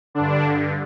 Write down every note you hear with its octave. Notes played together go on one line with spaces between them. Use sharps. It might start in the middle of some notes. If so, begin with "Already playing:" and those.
G2 D3 D4